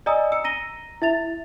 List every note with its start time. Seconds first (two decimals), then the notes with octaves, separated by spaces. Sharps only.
0.06 D5 D#5 G#5 A#5 D#6 E6
0.32 E6 C#7
0.44 A#5 A#6 D#7 G7
1.02 E4 E5 A6 F7